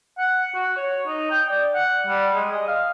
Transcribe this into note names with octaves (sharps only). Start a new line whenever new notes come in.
F#5
F#4
C#5
D#4
G5
D5
F#5
G3
G#3
D#5
F5